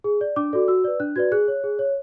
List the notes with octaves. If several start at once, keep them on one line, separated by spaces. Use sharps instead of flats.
G#4
D5
D4 D6
F#4 A4 D5
F#4 E6
B4 D5
D4 F#6
F#4 B4 D5 G#6
G#4 F#6
C#5
G#4
C#5